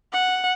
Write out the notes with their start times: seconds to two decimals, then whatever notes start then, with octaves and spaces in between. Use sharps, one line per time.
0.12 F#5